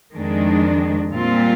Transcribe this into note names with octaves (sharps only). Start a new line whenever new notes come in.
F2 D#3 G#3 D4
A#2 G3 C4 F4